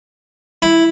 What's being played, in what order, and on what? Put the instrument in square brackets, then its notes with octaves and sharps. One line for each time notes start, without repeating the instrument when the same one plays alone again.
[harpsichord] E4